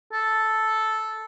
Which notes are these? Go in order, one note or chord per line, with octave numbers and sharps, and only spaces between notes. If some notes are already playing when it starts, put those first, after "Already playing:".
A4